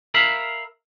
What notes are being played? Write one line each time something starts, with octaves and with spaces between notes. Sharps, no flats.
A#4 E5 F5 B5